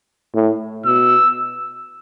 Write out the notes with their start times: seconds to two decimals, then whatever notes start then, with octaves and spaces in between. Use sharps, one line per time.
0.34 A2
0.85 B2 E6